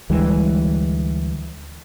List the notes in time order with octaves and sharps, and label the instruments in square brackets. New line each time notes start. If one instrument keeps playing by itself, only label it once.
[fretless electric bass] D2 E3 G3 G#3